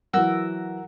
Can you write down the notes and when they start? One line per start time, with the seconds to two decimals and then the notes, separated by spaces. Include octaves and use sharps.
0.13 E3 F#3 F#4 A#4 E6